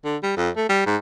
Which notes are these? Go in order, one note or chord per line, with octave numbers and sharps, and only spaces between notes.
D3
G3
F2
A3
G3
G#2